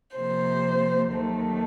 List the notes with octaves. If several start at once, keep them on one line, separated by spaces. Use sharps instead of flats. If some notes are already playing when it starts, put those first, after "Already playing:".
C3 F3 A#3 C5
D#2 D#3 F#3 A3